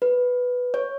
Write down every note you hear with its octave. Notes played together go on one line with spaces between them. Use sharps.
B4
C#5